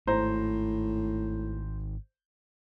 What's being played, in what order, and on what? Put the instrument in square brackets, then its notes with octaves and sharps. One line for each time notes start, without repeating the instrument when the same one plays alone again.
[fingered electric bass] G#1 [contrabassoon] A2 [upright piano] C5 A#5